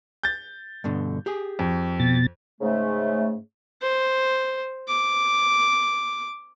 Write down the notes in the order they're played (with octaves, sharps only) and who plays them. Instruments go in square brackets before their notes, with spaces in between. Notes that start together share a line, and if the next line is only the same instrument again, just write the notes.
[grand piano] G6 A6
[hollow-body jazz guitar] G2 B2 D3
G4 G#4
[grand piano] F2
[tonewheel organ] B2 A6
[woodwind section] G#2 C#3 A3
[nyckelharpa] C5
D6